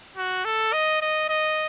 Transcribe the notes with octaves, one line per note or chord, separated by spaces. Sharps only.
F#4
A4
D#5
D#5
D#5